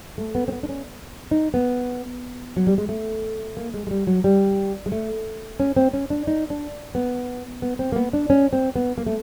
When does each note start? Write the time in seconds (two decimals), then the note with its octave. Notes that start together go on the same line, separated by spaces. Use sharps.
0.18 A3
0.35 B3
0.48 C4
0.52 B3
0.63 D4
0.69 C#4
1.31 D#4
1.54 B3
2.57 F#3
2.67 G3
2.78 G#3
2.89 A3
3.57 A#3
3.74 G#3
3.87 G#3
3.91 G3
4.07 F#3
4.24 G3
4.86 G#3
4.92 A3
5.60 C#4
5.76 C4
5.93 C#4
6.10 D4
6.27 D#4
6.50 D4
6.95 B3
7.62 B3
7.79 C4
7.92 A#3
7.96 B3
8.13 D4
8.30 C#4
8.53 C4
8.76 B3
8.98 A#3
9.07 A3